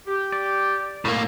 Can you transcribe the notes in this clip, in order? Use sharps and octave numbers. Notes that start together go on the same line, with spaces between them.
G4
D5
A2 A#3